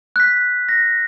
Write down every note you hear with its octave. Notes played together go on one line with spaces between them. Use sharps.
F#6 B6
A#6